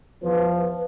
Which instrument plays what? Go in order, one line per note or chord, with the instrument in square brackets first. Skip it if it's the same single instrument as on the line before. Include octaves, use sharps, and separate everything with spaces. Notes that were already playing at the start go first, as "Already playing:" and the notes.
[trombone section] E2 F3 [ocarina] B4